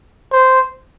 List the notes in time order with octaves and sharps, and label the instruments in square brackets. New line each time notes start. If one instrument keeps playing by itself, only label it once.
[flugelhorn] C5